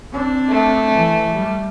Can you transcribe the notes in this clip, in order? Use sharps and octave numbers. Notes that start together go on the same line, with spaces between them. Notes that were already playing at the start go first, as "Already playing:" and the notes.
C4 D4
A3
E3
G3